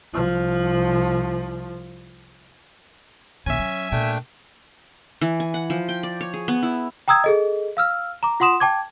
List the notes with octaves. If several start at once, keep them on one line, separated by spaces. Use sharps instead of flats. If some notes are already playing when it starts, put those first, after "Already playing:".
C2 F3
A#1 D3 C#4 E5 G#5
F#3
A#2 A3 D4 G5
E3
G#5
F#5
F3
G5
D5
C#5
G#4
B3
E4
G5 A#5 D#6 E6 G#6
G#4 A4 D#5
F5 E6 F6
A#5 D6
F4 F#5 C6 D#6 E7
G5 A5 D6 G#6